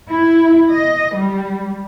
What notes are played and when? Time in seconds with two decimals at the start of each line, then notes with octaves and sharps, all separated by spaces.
0.11 E4
0.72 D#5
1.16 G3